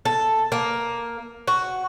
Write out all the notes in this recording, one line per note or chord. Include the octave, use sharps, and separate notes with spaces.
A4
A#3
F#4